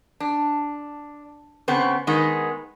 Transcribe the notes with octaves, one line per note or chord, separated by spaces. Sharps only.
D4
C#3 B3 C4
D#3 G#3 B3